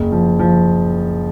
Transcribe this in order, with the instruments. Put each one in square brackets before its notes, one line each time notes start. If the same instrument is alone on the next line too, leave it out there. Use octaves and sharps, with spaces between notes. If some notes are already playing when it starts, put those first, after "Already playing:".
Already playing: [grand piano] F#1
F3
F3